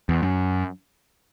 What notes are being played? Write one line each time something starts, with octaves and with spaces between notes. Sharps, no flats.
E2
F#2